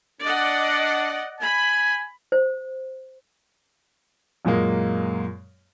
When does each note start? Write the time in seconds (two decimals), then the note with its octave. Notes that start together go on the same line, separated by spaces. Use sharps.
0.21 D4 D5 D#5 F#5
1.41 G#5 B5
2.32 C5
4.45 F#2 A#2 G#3 A#3